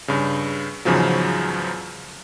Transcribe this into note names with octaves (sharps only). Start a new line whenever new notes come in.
G2 C#3
E2 G#2 C#3 F3 F#3